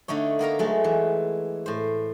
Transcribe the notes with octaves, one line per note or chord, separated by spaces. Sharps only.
D3 A3 D#4 C#5
A#3 B3 A#4 A#5
F#3 G#3 A3
E3
A2 C5